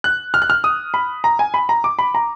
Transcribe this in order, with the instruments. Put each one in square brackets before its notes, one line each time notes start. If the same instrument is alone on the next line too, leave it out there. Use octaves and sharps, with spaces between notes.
[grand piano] F#6
F6
F#6
F6
D#6
B5
A#5
G#5
B5
A#5
D6
B5
A#5